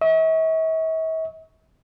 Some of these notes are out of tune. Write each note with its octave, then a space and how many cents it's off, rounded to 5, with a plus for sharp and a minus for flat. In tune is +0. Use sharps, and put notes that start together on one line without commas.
E5 -45 C#6 +5